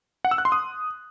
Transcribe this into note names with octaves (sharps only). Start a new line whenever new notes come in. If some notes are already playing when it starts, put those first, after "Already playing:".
F#5
E6
F#6
C6
D#6